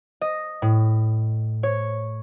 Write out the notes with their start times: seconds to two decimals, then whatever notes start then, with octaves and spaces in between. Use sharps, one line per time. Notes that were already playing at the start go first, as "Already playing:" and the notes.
0.21 D#5
0.62 A2
1.63 C#5